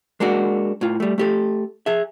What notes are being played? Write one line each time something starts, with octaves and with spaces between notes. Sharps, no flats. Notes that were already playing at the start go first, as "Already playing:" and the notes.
G#3 A#3 D4 F#4
A2 F4
G3 A3
A3 G4 A4
G#4 E5